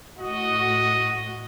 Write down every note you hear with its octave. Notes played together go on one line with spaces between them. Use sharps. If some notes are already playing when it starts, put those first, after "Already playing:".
A2 F#4 D#5